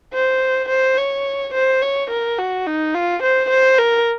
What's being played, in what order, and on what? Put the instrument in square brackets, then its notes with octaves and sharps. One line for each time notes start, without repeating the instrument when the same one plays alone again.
[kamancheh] C5
C5
C#5
C5
C#5
A#4
F#4
D#4
F4
C5
C5
A#4